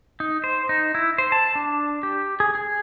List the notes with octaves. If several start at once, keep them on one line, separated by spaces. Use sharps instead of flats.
D#4
C5
D#4
E4
C5
A5
D4
G4
G#4
G#4